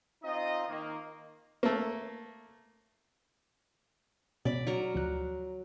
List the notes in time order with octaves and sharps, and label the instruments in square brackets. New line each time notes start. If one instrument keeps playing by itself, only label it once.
[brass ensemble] C4 D#4 F4 D#5
D#3 A#3
[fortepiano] A3 A#3
[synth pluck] B2 C#4 [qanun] D5 B5
[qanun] F#3 A#4 A#5
[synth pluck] D2 F3 F#6